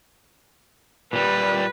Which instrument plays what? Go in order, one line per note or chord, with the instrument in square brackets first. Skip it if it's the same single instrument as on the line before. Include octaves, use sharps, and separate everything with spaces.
[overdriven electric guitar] A#2 G3 [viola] B4